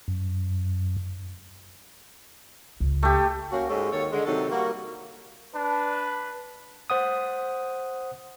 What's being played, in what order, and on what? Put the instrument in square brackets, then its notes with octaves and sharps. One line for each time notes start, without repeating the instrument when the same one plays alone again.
[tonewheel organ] F#2
[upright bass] C#2
[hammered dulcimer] A3 G4
[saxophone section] A#3 C#4 F#4
G#2 G#3 C#4 G4 A4
D#2 D#3 A4 C#5
D3 G#3
C3 D#3 F#3 D#4 A4
G3 A#3 F#4
[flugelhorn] D4 [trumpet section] B4
[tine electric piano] C5 F#5 D#6